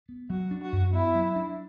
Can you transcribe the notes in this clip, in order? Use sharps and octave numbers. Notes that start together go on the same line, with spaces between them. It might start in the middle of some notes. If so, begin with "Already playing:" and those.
B3
F#3 F#4
D4
F#4
F#2
B3 E4
F#3
D4